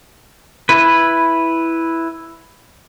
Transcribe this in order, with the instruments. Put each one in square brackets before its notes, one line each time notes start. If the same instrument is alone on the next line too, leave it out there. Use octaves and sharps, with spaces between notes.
[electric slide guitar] E4 B4